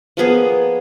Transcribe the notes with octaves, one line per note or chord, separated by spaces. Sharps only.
F3 A#3 B3 G#4